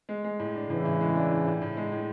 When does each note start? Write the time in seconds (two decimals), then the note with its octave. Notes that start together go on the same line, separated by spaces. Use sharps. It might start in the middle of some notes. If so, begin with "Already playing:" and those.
0.09 G#3
0.24 G#3
0.39 A2
0.55 D4
0.69 A2 C#3 E3
0.85 A2
1.00 G#3
1.15 D4
1.31 A2
1.46 A2
1.62 A2
1.77 G#3
1.92 A2